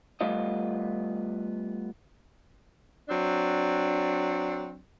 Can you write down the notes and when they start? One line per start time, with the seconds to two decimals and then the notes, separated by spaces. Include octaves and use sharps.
0.21 G3 A3 B3 F4 D#5
3.09 F#3 C4 D4